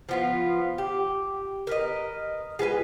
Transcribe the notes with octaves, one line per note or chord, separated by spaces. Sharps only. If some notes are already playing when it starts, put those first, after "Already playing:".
F3 B3 F4
G4
A#4 B4 D#5
G#3 F4 B4 G#5